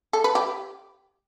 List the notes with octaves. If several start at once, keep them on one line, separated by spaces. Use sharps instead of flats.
A4
B4
G4